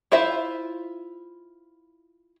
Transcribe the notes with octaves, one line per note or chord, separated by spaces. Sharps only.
E4 F4 C5 E5